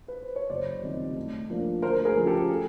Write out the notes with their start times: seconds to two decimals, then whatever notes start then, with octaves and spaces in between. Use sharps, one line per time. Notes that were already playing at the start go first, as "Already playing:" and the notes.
0.08 B4
0.22 C5
0.36 C#5
0.50 F#1 C5 D5
0.83 F2 C3 D#3 G3
1.16 A2
1.50 F3 A#3 D4
1.82 D2 A#4 C5
2.05 G#4 A#4
2.16 C#3 F3 A3
2.27 G4 A4
2.49 G#4